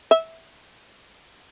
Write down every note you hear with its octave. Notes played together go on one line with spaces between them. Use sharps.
E5